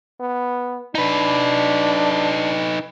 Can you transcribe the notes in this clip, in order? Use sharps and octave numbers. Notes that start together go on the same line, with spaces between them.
B3
D4 D#4 B4